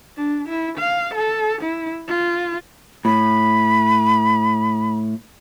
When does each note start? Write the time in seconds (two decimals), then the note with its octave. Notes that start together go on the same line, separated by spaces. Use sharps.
0.17 D4
0.48 E4
0.78 F5
1.14 A4
1.62 E4
2.08 F4
3.05 A2 B5